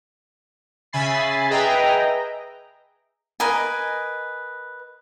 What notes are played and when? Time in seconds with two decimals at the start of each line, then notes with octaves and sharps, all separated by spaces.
0.93 C#3 E5 G#5 B5 A6 C7
1.50 G#4 B4 D#5 E5 G5 A#5
3.40 A#4 B4 D#5 G#5